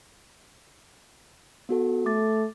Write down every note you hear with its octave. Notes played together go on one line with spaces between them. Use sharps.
B3 F#4 A4
A3 D6 A6